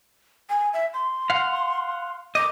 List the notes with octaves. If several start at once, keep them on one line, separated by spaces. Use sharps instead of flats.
G#5
E5
C6
F5 F#5
A#4 D#5 D6